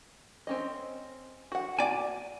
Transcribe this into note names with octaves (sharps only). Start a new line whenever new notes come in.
C4 C#4 D#5
F#4 F#5
D5 G#5